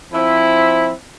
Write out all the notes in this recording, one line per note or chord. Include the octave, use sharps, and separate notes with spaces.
F3 C4 E4